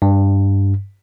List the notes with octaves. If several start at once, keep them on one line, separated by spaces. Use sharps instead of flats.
G2